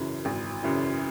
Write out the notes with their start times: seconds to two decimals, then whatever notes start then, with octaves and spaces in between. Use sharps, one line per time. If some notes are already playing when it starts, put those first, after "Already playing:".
Already playing: G#1 F#2 C#3 E3
0.25 G#1
0.63 F#2 C#3 E3